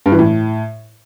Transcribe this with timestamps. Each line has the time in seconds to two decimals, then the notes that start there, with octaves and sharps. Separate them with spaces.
0.06 G2
0.12 E3
0.19 A2